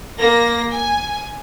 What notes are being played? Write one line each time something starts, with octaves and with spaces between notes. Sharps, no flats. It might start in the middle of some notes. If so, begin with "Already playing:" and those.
A#3 A#6
G#5